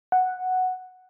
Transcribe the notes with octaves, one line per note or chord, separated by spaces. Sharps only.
F#5